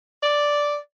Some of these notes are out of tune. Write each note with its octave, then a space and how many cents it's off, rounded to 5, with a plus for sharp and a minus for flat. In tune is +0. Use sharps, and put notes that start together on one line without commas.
D5 -5